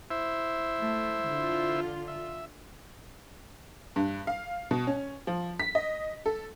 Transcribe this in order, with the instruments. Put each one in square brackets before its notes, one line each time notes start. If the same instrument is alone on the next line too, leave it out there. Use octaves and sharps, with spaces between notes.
[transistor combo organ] E4 C5 E5
[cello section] A3
D3 F4
[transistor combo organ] E5
[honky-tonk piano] G2
F5
B2
C#4
F3
B6
D#5
A4